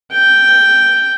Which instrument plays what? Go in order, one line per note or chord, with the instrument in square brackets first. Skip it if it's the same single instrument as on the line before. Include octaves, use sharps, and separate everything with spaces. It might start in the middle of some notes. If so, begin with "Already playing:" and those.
[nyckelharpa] G5